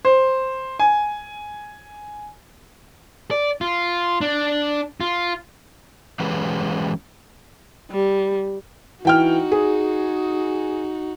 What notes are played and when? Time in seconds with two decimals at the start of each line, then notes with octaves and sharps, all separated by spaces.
0.05 C5
0.79 G#5
3.31 D5
3.61 F4
4.21 D4
5.01 F4
6.20 E3 F#3 G#3 C#4 G4 B4
7.91 G3
9.05 E3 D#4 F#4 G5 F6
9.52 G#4